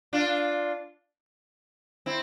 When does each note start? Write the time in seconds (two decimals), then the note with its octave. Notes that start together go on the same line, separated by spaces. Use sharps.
0.13 D4 F4
2.06 C4 E4